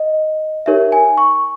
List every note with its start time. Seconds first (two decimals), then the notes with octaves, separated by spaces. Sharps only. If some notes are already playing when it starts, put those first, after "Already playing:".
Already playing: D#5
0.66 D#4 G4 A#4 C#5 E5
0.92 G#5
1.17 C#6